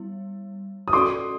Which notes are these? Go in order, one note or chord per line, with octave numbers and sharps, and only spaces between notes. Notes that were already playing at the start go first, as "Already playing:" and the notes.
Already playing: G3 B3 E4
D#6
C#4 F#4 A4 D5 C6 D6